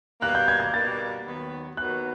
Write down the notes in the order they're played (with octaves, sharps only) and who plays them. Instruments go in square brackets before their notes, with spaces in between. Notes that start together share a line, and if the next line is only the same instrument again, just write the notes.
[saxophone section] B2 G3 A#3 [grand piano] F#6
[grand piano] G6
G#6
G#6
[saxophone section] B2 G3 A#3 [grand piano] A6
[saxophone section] D#2 D#3 F#3 B3
[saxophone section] D#2 D#3 F#3 B3 [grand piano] F#6